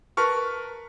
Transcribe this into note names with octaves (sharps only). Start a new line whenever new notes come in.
A#4 B4 A5 C#6 F6